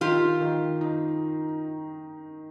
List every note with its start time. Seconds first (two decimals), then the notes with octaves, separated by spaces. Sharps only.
0.01 D#3 F4 G4
0.41 D#3
0.81 D#4